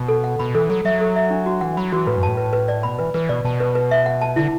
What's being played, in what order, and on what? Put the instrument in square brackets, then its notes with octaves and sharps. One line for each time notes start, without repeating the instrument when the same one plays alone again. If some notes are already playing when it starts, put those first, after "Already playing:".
Already playing: [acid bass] B2
[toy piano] A4
F#5
[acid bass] B2 [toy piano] B5
[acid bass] E3 [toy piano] A4
[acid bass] F#3 [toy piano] A4
[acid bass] F#3 [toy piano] E5
[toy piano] A4
E5
D4
F#4
[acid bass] E3 [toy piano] F#5
[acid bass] F#3 [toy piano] B5
[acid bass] E3 [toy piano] F#4
[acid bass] A2 [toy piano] B4
[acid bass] F#2
[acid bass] A2 [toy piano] A5
[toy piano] B4
B4
D5
[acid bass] B2 [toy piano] B5
[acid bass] E3 [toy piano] B4
[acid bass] E3 [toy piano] B4
[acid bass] B2 [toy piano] D5
[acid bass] B2 [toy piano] A5
[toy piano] B4
B4
E5
F#5
A5
[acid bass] D3 [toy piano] E4